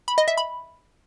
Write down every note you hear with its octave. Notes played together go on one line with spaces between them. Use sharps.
B5
D#5
E5
B5